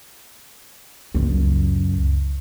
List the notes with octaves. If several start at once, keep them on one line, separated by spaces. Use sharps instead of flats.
C#2 F#2